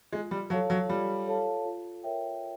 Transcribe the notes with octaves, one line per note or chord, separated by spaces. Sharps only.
G#3 F4
G3
F#3 A4 C#5 F5 A5
F#3
G3 F4
A4 C#5 F5 A5
F4
A#4 C#5 E5 G5